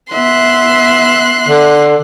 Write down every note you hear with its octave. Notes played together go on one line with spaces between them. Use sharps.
B3 E5 C6 F#6
D3